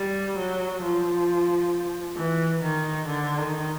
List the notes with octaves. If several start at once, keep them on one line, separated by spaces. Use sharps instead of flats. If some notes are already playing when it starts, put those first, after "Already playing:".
Already playing: G3
F#3
F3
E3
D#3
D3
D#3